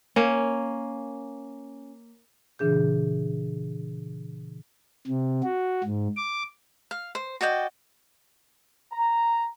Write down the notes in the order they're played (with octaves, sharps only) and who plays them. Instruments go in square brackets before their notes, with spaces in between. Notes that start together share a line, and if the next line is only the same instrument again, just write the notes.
[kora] A#3 C#4
[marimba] A#2 C#3 E3 D4 G#4 G6
[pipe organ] C3
F#4
G#2
D6
[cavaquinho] F5
C5
F#4 D5 D#5 G5
[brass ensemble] A#5